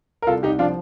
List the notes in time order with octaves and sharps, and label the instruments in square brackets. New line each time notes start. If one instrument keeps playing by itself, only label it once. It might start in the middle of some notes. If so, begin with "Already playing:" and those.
[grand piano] A#4
C2 F4 A4
C2 D#4 G4
F3 D4 F4